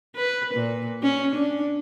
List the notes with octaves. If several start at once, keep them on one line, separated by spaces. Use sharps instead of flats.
B4
A#2
C#4
D4